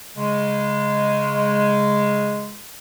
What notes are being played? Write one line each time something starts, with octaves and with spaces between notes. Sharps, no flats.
C#3 G#3